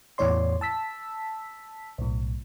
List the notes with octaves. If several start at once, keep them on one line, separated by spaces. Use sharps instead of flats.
E2 A2 E3 C#5 D5 C6
A5 E6 B6
B1 A2